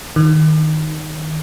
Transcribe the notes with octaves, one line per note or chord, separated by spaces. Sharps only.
D#3